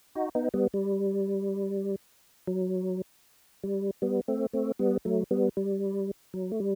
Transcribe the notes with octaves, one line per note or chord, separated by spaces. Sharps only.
D#4 F#4
B3 D#4
G3 B3
G3
F#3
G3
G3 B3
A3 C4
A3 C4
G3 B3
F#3 A3
G3 B3
G3
F#3
A3
G3